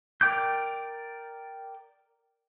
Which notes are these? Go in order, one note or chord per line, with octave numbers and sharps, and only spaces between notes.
A#4 D5 G5 D6 G6